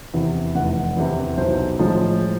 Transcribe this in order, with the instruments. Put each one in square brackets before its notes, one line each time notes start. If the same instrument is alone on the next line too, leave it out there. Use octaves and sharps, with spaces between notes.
[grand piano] E2 C3 E3
F1 F#5
E2 C3 E3
B1 C5
A2 F3 G#3